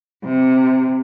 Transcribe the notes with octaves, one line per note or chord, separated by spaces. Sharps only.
C3